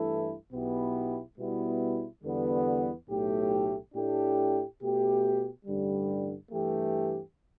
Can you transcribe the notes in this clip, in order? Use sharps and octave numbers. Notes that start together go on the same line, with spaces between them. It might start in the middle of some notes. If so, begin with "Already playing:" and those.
Already playing: G2 E3 A3 E4 A4
B1 B2 B3 E4 G4
B2 G3 B3 E4
E2 D3 G3 B3
B1 A2 A3 G4
A2 A3 D4 G4
B2 A3 G4
A1 G2 D3 G3
G2 E3 A3 G4